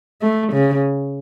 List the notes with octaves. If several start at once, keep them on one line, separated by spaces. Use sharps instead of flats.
A3
C#3